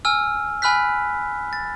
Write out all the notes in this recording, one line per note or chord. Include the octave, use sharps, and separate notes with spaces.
G#5 E6 F6
G#5 B5 F6 F#6 B6
A6